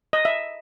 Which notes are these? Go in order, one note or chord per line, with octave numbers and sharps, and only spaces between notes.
D#5
E5